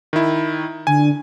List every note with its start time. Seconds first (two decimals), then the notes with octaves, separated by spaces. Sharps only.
0.13 D#3 E4
0.87 D3 G#5